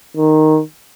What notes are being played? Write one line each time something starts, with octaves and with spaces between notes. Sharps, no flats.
D#3